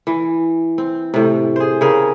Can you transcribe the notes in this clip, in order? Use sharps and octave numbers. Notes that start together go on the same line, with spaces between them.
E3
C4
A2 C3
G#4 C5
C#3 C4 G#4 A#4